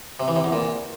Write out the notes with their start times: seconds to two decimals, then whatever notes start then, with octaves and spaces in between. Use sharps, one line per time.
0.20 C3
0.28 E3
0.36 C3
0.44 E2
0.52 A#2